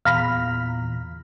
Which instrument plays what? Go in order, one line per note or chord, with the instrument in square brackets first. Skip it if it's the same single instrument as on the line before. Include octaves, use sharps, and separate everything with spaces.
[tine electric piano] E2 [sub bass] A#2 [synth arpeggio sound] F5 A#5 B5 [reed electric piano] F6